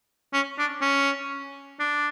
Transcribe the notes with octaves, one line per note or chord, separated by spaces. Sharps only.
C#4
D4
C#4
D4